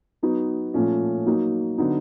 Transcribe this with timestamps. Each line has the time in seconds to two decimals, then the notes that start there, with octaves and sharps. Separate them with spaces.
0.23 F#3 B3 D#4 F#4
0.74 A#2 F3 A3 C#4
1.26 F#3 A#3 D#4 F#4
1.78 D3 F#3 B3 D#4